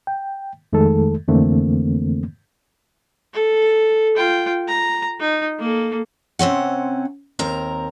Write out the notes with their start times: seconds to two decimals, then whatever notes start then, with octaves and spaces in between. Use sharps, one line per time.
0.07 G5
0.73 F2 D#3 G#3 A3 A4
1.28 F2 D3 E3 A3 A#3 C4
3.34 A4
4.16 F4 G5
4.68 A#5
5.20 D#4
5.59 A#3 A4
6.39 C3 C4 C#4 F#5
7.39 D#2 C4 A#4 A#5